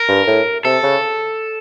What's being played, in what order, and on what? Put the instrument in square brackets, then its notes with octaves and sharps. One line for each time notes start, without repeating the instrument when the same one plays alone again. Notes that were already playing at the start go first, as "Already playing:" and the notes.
Already playing: [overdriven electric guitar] A#4
[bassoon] G2
A2
[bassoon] C3 [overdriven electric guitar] A4
[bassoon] C#3